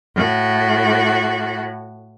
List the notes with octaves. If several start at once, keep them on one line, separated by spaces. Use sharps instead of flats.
A2 F#4